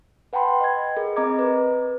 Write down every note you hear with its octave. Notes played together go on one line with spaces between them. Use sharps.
B4 F#5 G5 A5 B5 C6
B5
D#5 G#6
G#4 A#4
C4 D#5 A#5 D6 G#6
B4